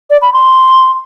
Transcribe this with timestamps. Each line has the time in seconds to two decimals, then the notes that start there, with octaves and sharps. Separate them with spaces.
0.10 D5
0.22 B5
0.33 C6